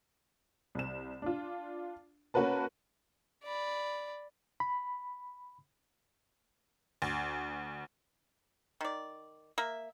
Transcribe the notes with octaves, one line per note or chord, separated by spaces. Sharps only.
C2 E7
D4 F4
A#3 C#4 F#4 A#4 B4 A5
D5 B5
B5
D2
D#3 D5
A#3 E5